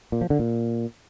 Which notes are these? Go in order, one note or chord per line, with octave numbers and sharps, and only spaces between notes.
A#2
F3
D3
A#2